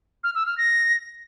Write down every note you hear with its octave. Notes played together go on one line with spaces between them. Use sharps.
F6
E6
F6
A#6